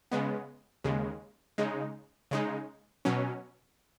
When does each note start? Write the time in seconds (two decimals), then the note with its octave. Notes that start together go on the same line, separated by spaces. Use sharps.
0.11 C#3 G#3 B3
0.84 D#2 C#3 G#3
1.58 C#3 G#3 D#4
2.31 C#3 G#3 D#4
3.05 B2 F#3 C#4